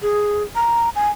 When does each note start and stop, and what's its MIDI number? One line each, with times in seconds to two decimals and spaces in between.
0.02 0.43 68
0.55 0.90 82
0.96 1.11 80